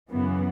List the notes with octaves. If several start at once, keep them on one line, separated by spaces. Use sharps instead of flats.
F#2 C#3 E3 B3